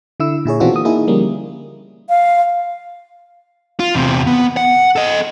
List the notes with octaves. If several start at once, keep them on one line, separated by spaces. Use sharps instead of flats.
D3 E4 E6
A#2 E4 G#4 C#5
B2 E3 C4 D4 F4 F#4
A#3 D#6
A#3 D#4 E4 G#4
D3 F3 G3 A#3 C#4
F5
F4
E2 C3
B3
F#5
A4 D#5